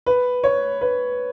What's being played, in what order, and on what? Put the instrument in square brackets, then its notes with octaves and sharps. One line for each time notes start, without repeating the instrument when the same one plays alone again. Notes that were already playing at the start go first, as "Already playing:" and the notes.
[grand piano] B4
C#5
B4